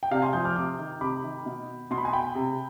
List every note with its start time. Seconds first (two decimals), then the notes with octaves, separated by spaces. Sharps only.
0.03 G5
0.11 C3 D5 F5
0.22 G#5 C6
0.33 F3 D#6 G6
0.45 D6 F6
0.56 C3 D6 F6
0.79 D#3
1.01 C3 B5 D6
1.24 D#3
1.46 B2
1.91 B2 C6
1.98 B5
2.05 G#5
2.13 G5 B5
2.35 C3